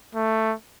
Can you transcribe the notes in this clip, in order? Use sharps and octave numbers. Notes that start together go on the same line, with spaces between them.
A3